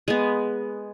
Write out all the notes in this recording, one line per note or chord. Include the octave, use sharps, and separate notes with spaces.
G#3 B3